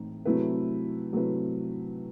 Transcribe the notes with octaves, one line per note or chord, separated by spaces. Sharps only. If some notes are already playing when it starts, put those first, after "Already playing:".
Already playing: A2 E3 A3 C4 D#4
C3 F#3 A3 E4 B4
C3 F#3 A3 E4 B4